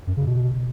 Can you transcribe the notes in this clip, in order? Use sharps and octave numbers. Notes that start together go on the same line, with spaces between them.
F#2
C#3
B2